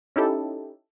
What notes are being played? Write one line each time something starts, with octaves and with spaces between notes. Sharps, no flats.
C#4 D#4 E4 G4 A4